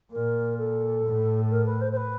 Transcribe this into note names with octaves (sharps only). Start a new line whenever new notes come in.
A#2 A#4
A4
A2
A#4
B4
C5
C5
B4